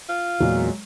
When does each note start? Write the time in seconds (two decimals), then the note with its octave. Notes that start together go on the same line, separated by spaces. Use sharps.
0.09 F4
0.40 E2 A#2 F#3 G#3